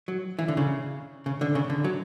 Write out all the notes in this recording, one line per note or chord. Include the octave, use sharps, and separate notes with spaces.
F#3
E3
D3
C#3
C#3
D3
C#3
D3
F#3